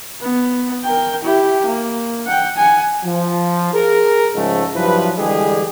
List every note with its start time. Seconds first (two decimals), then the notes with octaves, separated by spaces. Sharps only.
0.21 B3
0.84 A#4 G5
1.23 E4 G4
1.66 A#3
2.26 F#5 G5
2.57 F#5 G#5
3.05 F3
3.73 G#4 A#4
4.35 G#2 C#3 F3 G#3 A3
4.75 G2 F3 F#3 E4 B4
5.19 D3 E3 G3 G#3 G4 G#4